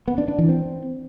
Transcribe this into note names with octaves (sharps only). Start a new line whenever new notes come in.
B3
D4
D4
E3
C4